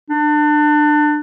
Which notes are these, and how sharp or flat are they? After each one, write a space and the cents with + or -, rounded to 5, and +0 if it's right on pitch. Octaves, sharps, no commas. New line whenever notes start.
D4 +30